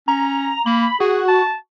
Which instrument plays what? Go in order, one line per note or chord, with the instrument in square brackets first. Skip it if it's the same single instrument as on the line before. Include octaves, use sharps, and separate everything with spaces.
[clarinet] C#4 [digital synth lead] A#5
[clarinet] A#3 [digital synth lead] B5
[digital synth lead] F#4 [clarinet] G#4
[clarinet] A5